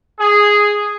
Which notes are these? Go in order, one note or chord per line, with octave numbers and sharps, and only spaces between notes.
G#4